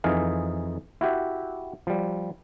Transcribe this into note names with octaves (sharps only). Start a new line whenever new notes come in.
F2 E3 D#4 G#4 F5
E4 F#4 G4 E5
F3 G3